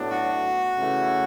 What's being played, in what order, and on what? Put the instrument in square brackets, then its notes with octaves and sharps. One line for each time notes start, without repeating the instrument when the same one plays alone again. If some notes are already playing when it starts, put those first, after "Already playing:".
Already playing: [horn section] A2 F#3 B3 D4
[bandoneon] F#4
[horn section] C#3 E3 A3 E4